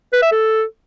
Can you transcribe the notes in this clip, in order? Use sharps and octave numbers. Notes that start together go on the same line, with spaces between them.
B4
E5
A4